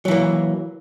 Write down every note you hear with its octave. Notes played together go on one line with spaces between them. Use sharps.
E3 F#3 A#3